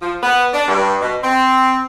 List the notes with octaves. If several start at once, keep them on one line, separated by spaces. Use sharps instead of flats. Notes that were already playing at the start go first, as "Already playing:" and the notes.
F3
B3
D4
G2
B2
C4